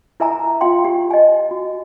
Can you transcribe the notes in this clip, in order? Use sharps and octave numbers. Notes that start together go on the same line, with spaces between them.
E4 A#4 E5 G#5 A#5
F4 F5 G5 C6
G4
D#5 G#5
F#4